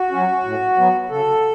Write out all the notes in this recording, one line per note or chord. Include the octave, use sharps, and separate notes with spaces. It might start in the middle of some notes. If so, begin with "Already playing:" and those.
Already playing: F#4
F#3 C#4
A2
F#3 B3
C#3 A4